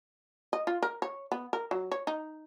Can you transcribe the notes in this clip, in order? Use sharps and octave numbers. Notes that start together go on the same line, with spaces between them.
D#5
F4
A#4
C#5
B3
A#4
F#3
C#5
D#4